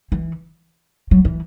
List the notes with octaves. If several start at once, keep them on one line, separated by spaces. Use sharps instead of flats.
E3
F#3
E3